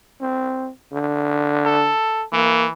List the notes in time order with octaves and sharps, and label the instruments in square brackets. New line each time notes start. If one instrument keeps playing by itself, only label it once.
[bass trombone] C4
D3
[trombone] A4
[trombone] E3 [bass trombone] A#3